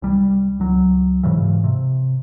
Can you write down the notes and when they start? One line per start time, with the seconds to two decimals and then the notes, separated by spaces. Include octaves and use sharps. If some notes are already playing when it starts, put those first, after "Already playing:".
0.02 C2 G3
0.59 C#2 F#3
1.23 G#2 C#3 E3
1.64 C3